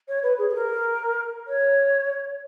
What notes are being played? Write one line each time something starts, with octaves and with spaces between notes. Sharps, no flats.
C#5
B4
G#4
G#4
A#4
C#5